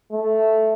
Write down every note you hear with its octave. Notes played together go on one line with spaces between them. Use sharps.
A3